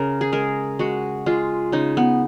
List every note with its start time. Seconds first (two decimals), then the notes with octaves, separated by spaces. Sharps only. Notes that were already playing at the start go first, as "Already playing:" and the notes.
Already playing: C#3 A#4
0.21 G#4
0.33 G#3 A#4
0.79 G#3 F#4
1.26 G#3 F4
1.72 C#3 D#4
1.97 B3